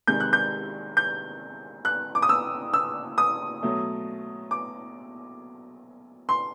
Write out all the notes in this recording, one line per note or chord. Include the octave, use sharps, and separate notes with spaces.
C2 C3 D#3 G#3 G6
F#6
G6
G6
F#6
D6
D#6
E6
E6
D#6
B2 F#3 A3
D6
C6